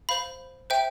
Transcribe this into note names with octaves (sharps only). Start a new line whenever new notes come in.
C5 F5 B5
C5 E5 G5